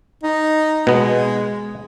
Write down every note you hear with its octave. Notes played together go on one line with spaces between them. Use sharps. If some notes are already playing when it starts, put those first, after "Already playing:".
D#4
B2 G#3 B3